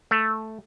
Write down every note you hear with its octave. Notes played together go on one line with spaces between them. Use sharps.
A3